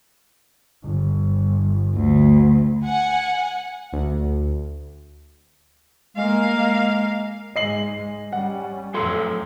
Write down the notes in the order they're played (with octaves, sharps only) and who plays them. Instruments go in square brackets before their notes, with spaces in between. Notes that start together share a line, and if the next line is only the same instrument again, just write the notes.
[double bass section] G1
[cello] D2
[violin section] F#5 G#5
[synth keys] D2
[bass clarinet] G#3 [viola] A#3 F5
[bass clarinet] G#3
[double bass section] G#2 G#3 [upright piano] D#5 C7 F#7
[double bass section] G3 C#4 [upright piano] F#5
[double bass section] F2 A2 [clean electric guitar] F#3 A4 C6